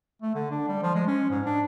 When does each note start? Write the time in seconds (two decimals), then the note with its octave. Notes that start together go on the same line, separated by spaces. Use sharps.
0.22 A3
0.34 D3
0.51 D4
0.68 G3
0.83 F3
0.95 G#3
1.07 C#4
1.30 G#2
1.46 D4